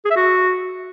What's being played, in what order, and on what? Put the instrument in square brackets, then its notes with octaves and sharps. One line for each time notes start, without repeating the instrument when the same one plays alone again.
[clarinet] G#4
E5
F#4